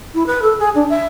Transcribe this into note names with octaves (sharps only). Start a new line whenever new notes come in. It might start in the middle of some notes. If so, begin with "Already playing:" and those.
E4
B4
A4
G#4
D4
E5